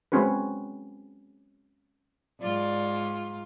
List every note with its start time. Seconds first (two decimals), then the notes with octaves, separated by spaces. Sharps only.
0.12 G#3 C4 C#4 F#4 B4
2.42 G#2 F4 D5